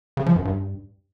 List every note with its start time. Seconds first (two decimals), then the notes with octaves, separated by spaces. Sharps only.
0.17 C#3
0.26 F3
0.36 F#2
0.45 G2